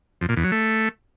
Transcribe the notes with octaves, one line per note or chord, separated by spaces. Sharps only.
F2
A#2
E2
F#3
A3